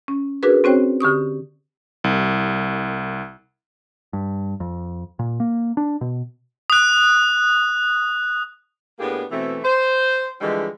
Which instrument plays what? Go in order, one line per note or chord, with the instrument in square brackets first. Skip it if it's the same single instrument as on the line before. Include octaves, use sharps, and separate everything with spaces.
[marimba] C#4
D4 F#4 G#4 A#4 B4
C4 C#4 F#4 C5 C#5 G5
D3 G4 C#6 D#6
[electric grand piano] C2
[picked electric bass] G2
F2
A#2
A#3
D4
B2
[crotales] D#6 F#6
[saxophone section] A2 A#3 B3 D4 G4 G#4
B2 E3 A3 C4
C5
D3 E3 F3 G3 G#3